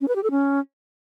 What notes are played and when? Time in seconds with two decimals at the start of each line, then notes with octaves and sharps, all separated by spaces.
0.01 C#4
0.08 B4
0.16 G4
0.23 A4
0.31 C#4